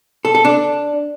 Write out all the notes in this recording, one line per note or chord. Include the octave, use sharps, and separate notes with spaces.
A4
A4
D4